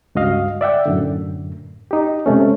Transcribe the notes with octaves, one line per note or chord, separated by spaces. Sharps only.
C#2 G2 F#4 D#5 F5
D5 E5 F#5 G5
F#2 A2 D3
D#4 G4
C3 G#3 A3 C#4